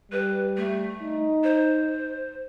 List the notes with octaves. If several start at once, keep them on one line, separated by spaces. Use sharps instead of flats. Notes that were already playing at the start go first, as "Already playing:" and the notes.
G3 B4
A3
D#4
C5